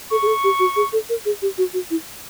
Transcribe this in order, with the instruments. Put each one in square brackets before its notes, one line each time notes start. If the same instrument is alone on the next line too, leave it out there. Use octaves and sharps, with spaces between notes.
[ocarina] A4 [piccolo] C#6
[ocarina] G#4
A4
G4
F#4
G#4
A4
A#4
G#4
G4
F#4
F#4
E4